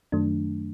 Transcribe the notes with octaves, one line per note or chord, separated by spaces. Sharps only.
F#2 D#3 F#3 A3 D4